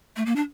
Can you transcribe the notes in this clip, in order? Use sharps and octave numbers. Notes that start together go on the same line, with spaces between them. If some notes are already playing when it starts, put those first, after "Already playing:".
A3
A#3
D4